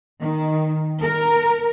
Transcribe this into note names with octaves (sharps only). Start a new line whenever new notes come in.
D#3
A#4